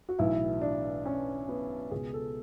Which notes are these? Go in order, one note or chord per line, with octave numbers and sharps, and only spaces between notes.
F#4
B1 A2 E3 E4
D4
C#4
B3
C#2 B2 G#4
A4